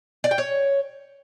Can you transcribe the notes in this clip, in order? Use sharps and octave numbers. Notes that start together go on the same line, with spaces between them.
D5
G5
C#5